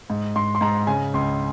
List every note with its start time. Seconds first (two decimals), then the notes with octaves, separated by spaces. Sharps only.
0.10 G#2
0.36 G#2 C6
0.55 C6
0.61 G#2 A#5
0.87 C#3 G#5
1.14 C#2 C6